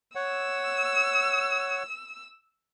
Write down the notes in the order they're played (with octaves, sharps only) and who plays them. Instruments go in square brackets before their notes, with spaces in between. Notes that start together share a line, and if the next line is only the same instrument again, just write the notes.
[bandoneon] C#5 F#5 [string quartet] E6